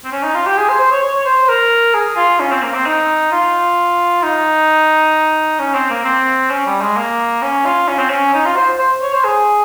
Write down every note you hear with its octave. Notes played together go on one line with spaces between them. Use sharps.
C4
C#4
D#4
F4
G4
G#4
C5
C5
C#5
C#5
C#5
C5
A#4
G#4
F4
C#4
C4
A#3
C4
D#4
F4
D#4
C#4
C4
A#3
C4
C#4
G3
G#3
A#3
C#4
F4
C#4
C4
C#4
D#4
F4
C5
C5
C#5
C5
G#4